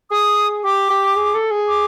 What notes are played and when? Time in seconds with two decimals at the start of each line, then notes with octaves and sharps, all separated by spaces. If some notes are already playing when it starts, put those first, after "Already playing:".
0.11 G#4 D#6
0.64 G4 D6
0.90 G4
1.16 G#4
1.34 A4
1.51 G#4
1.68 D6